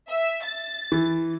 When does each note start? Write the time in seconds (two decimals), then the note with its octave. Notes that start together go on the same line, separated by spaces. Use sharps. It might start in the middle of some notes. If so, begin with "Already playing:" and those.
0.10 E5
0.43 A6
0.92 E3